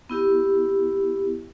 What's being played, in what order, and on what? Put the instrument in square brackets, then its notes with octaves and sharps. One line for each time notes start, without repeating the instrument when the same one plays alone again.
[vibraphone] B3 E4 G4